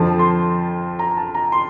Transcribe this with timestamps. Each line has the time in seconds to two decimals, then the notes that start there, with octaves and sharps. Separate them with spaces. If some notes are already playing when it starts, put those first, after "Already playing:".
Already playing: F2 D3 F3 A5
0.19 C6
0.99 A#5
1.17 A5
1.35 A#5
1.52 C6